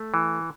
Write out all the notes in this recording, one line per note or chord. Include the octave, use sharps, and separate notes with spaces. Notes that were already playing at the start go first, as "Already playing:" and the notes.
Already playing: A3
E3